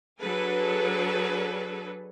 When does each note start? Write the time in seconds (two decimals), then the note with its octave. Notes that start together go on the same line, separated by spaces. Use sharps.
0.22 F#3 D4 G#4 A4 B4